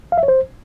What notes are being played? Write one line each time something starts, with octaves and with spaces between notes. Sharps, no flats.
F5
E5
C#5
C5